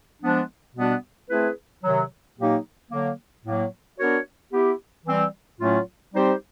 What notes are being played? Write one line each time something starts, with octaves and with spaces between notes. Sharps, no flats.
F3 G#3 B3 D4
B2 G3 B3 D4 F#4
A3 C4 E4 G#4 B4
C3 D#3 F#3
A#2 F#3 A#3 D#4 G4
D3 F#3 A#3
A2 F#3 A#3
B3 D4 F#4 A#4 C#5
B3 E4 G4
E3 G3 C4
A2 F#3 A3 C#4 F4
G3 C4 D#4 G4 C5